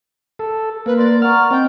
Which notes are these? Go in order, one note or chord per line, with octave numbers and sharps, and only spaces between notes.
A4
A#3 B4
A#4 D5 C6
F#5 A#5 C#6 F6
C4 D#5 G5